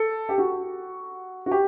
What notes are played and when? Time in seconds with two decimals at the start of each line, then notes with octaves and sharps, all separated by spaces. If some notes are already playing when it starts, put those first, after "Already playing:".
Already playing: A4
0.29 G4
0.38 F#4
1.46 F#4
1.51 G4